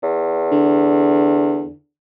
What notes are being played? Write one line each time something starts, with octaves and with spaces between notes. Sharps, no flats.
E2
D3